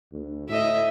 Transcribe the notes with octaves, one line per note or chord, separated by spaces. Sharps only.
D2
A2 D#5 E5